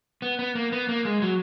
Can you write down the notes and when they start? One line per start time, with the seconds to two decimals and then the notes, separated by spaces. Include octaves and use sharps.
0.22 B3
0.39 B3
0.55 A#3
0.72 B3
0.89 A#3
1.05 G#3
1.22 F#3